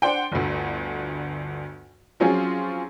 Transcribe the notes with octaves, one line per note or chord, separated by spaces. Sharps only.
D4 C5 F#5 G5
G1 D2
F3 F#3 C4 C#4 F4 G#4